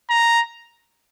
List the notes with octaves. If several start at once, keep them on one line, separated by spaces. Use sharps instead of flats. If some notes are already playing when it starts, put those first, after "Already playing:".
A#5